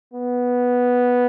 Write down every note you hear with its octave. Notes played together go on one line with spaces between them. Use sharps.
B3